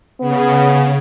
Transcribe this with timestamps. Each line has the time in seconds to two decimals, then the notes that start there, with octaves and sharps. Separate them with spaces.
0.21 C#3 B3